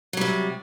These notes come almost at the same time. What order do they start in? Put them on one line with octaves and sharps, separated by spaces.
F#3 G3 C3